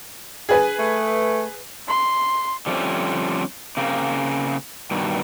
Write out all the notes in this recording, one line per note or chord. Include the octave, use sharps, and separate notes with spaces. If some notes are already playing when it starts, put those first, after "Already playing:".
G#4 B4 G#5
A3
C6
D3 F3 G3 A3 C4 C#4
C#3 A#3 C4
G2 B2 D#3